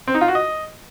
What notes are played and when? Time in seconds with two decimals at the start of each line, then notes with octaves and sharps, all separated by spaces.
0.07 C4
0.14 D#4
0.21 F4
0.28 F#4
0.35 D#5